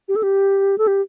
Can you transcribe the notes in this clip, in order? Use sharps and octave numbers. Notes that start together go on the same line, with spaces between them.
G4
A4
G4
A4
G4